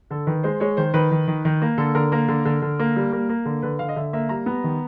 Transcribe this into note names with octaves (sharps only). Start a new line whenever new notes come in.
D3 A4
D#3 B4
G#3 C5
G#3 C#5
D#3 C5
D#3 B4
D#3
D#3
D#3
A#3
D3 A4
D3 A#4
A#3 A#4
D3
D3
D3
A#3
G3
A#3
A#3
D3
D3 B4
D3 F5
D#5
D3 E5
A#3 E5
G3 A#5
B3
D#3